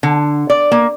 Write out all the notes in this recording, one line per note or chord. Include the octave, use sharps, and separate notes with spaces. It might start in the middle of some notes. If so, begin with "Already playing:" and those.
D3
D5
A#3